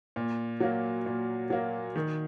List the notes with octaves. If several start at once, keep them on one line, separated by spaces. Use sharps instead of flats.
A#2
F#3 A#3
A#2
F#3 A#3
D#3